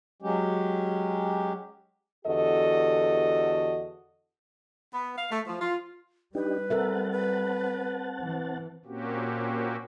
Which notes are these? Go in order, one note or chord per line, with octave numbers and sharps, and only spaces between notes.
F#3 G#3 C#4 G4
E2 D3 F#4 G4 A4 D#5
B3
F5
A3
F3
F4
G3 D4 D#4 G4 B4
C4 A4 A#4 E5 F#5 A5
B4
E3
A#2 A#3 C4 C#4 F#4 G4